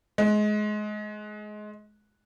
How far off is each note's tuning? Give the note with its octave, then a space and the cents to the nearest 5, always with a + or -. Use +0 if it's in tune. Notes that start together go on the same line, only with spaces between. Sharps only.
G#3 +25